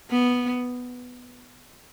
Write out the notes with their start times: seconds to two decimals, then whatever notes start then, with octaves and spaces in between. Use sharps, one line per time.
0.11 B3